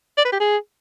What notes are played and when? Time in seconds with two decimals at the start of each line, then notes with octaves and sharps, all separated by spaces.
0.17 D5
0.25 B4
0.32 G4
0.40 G#4